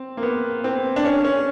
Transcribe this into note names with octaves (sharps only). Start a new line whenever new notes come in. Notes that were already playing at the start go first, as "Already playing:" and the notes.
Already playing: C4
A#3
B3
C4
D4
C#4
C#4